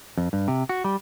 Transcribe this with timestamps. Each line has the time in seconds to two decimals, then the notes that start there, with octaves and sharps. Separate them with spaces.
0.18 F2
0.33 G2
0.48 C3
0.69 F#4
0.84 G3